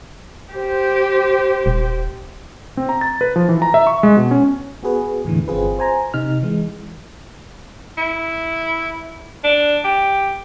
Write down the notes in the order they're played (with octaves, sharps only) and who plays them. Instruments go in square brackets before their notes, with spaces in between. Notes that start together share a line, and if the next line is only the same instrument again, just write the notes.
[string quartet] G4 C5
[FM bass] D#1
[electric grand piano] C4
A#5
A6
B4
F3
E3
A#5
E5
C#6
G#3
B2
C#4
[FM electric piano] B3 F#4 G#4 B4
E2 A2 D3 E3
G1 C4 F4 G#4 B4
C5 G#5 A#5
C3 D#4 F6
E3 G#3
[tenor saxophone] E4
D4
G4